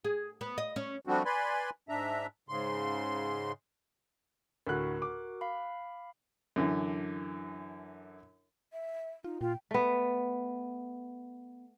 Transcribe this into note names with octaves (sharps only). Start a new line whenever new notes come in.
G#4
B3
D#5
C#4
F3 G3 A3 C4 D4 F#4
B4 D5 G#5 B5 C6
G#2 D4 E5 A#5
G#2 C#3 C6
D2 A2 F#4 A#4 F#6
D6
F5 B5
F#2 D3 E3
E5
D#4 F4
A#2 F4 G5
A3 B3